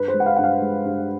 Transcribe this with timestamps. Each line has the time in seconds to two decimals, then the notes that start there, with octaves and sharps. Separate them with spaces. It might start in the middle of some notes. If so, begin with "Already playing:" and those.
Already playing: G2 B4
0.08 C5
0.14 G#3
0.20 F#5
0.26 F5
0.36 G2 F#5
0.44 F5
0.62 G#3
0.85 G2